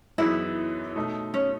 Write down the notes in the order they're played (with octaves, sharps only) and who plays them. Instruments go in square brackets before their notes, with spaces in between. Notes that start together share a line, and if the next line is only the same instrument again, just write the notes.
[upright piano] F#2 E3 B3 D#4 G#4 [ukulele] E4
[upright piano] B2 A3 D#4
[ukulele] C#4